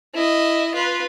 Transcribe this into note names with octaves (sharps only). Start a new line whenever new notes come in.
E4 D#5
F4 B4